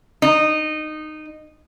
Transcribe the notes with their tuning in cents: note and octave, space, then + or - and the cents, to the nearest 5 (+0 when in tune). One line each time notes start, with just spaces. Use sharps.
D#4 -15